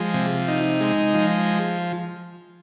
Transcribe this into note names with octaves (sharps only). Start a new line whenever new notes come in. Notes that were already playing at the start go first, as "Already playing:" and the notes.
Already playing: F3 G#3
C3
D#4
G#3
F3